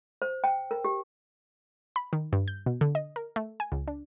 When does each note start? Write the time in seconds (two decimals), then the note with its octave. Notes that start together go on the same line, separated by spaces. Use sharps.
0.22 C5
0.44 G5
0.71 A#4
0.85 G4
1.96 B5
2.13 D#3
2.33 G2
2.48 G6
2.66 B2
2.81 D3
2.95 D#5
3.16 A#4
3.36 A3
3.60 G#5
3.72 C#2
3.88 D4